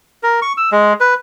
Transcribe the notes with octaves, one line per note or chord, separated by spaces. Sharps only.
A#4
C#6
E6
G#3
B4